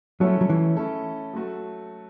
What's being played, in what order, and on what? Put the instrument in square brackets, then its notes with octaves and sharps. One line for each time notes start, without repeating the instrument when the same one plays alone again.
[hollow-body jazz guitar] F#3 [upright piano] A3 C#4 E4 A4
[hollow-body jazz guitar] F#3
E3
[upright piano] A3 C#4 E4 A4
F#3 A3 F#4 A4